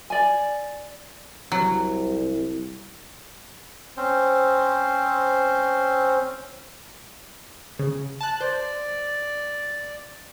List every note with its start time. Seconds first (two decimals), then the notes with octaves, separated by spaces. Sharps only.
0.10 D5 G#5
1.52 C2 F#3
3.97 C4 C#4 C5
7.79 C#3
8.21 A5 F#6
8.40 C5 D5